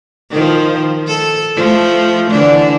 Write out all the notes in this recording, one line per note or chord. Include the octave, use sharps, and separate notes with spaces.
D#3 F3
A4
F3 A3
D3 E3 D4